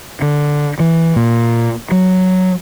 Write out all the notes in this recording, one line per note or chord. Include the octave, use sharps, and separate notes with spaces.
D3
E3
A#2
F#3